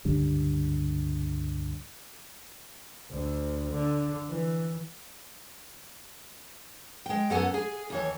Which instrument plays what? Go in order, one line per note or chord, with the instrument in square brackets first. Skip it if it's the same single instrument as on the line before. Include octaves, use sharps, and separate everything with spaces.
[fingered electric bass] C#2 G2 D3 G3
[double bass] D2
D3
E3
[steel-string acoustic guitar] G#3 G5
F#2 B3 A4 F#5 G#5
G#4 G#5
D#2 E3 C#5